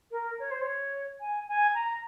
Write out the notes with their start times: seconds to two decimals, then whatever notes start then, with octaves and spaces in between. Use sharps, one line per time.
0.12 A#4
0.39 C#5
0.51 C5
0.62 C#5
1.21 G#5
1.48 G#5
1.75 A#5